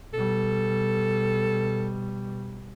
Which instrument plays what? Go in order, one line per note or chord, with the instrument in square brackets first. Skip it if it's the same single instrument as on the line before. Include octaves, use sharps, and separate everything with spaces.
[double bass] B2 G3 [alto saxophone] A4